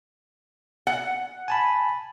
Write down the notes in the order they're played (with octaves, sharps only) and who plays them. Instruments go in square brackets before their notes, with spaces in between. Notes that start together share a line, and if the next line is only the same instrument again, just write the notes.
[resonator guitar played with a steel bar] F#5
[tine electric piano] G#5 A5 B5